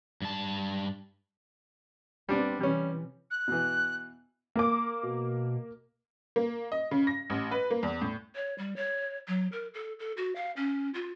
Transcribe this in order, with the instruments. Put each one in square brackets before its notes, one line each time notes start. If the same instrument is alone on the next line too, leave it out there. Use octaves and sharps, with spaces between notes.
[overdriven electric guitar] G2 A5
[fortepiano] G3 D4 [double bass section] B3 C4
[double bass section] C3 E3 [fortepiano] G3 C#4
[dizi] F#6
[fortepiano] B2 E3
[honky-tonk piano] A#3 D6
[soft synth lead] B2
[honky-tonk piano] A#3
D#5
C#3
A#6
A1
B4
A#3
E2
A2
[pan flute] C#5
G3
C#5
F#3
A#4
A4
A4
F#4
F5
C#4
F4